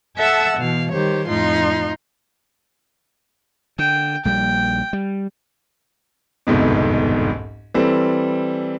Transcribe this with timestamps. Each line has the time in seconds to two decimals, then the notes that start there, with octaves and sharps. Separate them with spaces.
0.17 A4 E5 F#5 A5 E6
0.58 B2 E3 F5
0.92 D#3 G3 G4 C5 C#5
1.27 F2 A2 D#4 F4 C6
3.79 D3 G5
4.25 A#1 G3 A#3 G5
4.93 G3
6.47 G1 C2 F2 G#2 B2
7.74 E3 G3 C4 A4